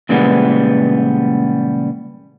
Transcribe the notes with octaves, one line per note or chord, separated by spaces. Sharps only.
A#2 C#3 E3 G3 G#3 B3